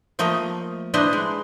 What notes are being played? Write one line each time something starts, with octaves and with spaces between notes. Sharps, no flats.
F3 A3 A#3 D#5
D4 E4 B4 C5 D#5
G#3